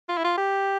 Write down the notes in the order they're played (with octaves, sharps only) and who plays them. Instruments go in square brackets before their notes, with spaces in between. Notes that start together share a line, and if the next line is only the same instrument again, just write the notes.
[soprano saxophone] F4
E4
F4
G4